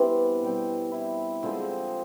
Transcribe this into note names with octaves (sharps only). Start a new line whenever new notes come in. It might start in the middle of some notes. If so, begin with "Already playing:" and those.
Already playing: E3 G3 B3 C4 D4
B2 G3 C4
E4
D3 F3 G#3 C4